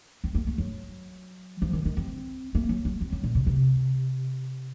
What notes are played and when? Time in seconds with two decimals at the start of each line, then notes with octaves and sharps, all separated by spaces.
0.24 C4
0.35 A#3
0.47 A3
0.58 F#3
1.62 F3
1.73 D#3
1.85 D#3
1.97 C4
2.55 A#3
2.69 F#3
2.85 A3
3.01 C4
3.12 F#3
3.23 A#2
3.35 C3
3.47 C3